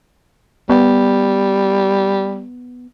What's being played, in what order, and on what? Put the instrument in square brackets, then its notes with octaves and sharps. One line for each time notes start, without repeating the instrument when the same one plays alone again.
[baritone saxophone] G3 [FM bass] B3